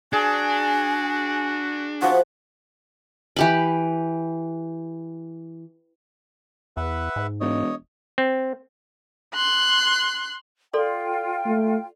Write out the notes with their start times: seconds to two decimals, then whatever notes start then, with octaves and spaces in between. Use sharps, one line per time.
0.13 D4 F#4 G#4 G#5
2.02 F3 F#4 F#5
3.36 E3 G4 B5
6.77 E2 B4 E5 F#5
7.16 G#2
7.41 E1 C#5 D#5
8.18 C4
9.34 C6 F#6
10.73 F4 A4 D5 G5 C6
11.46 A3